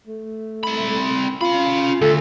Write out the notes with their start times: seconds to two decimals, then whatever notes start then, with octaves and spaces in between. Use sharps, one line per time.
0.07 A3
0.64 C4 B5
1.41 C#4 F4 B5
2.01 D2 A4